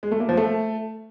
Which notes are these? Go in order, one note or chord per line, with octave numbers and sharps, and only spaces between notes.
G#3
A3
A#3
F3
A3